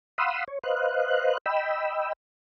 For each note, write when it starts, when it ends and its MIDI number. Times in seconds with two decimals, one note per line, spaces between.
0.18 0.44 77
0.18 0.44 78
0.18 0.44 83
0.18 0.44 84
0.18 0.44 87
0.18 0.44 88
0.48 0.59 73
0.63 1.38 71
0.63 1.38 72
0.63 1.38 75
0.63 1.38 77
0.63 1.38 90
1.46 2.13 75
1.46 2.13 79
1.46 2.13 83
1.46 2.13 88